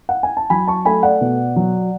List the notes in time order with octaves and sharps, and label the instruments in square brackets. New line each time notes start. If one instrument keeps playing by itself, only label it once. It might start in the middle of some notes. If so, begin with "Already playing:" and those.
[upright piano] F#5
G#5
A5
F#3 G#5 B5
A5 C#6
A3 G#5 B5
D5 F#5
B2
F#3